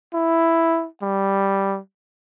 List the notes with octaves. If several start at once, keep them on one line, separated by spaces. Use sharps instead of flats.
E4
G3